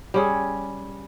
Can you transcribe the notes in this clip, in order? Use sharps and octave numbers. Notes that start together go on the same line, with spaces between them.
G3 C#4 G#4